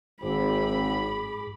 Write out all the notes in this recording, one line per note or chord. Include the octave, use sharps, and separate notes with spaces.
G#1 G#2 C4 G#4 B5 D6